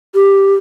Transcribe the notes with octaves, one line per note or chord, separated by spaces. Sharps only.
G4